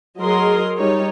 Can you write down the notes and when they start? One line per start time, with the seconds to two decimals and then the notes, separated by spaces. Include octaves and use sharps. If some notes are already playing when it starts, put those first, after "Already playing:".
0.21 F#3 G#4 A#4 D#5 C6
0.76 G3 D#4 C#5